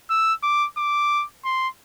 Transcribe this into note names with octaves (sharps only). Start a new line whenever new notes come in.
E6
D6
D6
C6